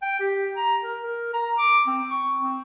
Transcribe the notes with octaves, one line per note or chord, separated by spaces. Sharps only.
G5
G4
A#5
A#4
A#4
A#5
D6
C4
C#6
C4